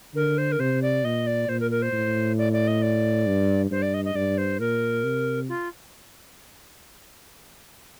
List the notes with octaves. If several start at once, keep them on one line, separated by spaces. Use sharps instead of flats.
D3 A#4
C5
A#4
C3 C5
D5
A#2 D#5
D5
A#2 C5
A#4
A#4
C5
A2
D5
D5
D#5
D5
G2
G2 C5
D5
D#5
D#5
G2 D5
C5
A#2 A#4
C3
F4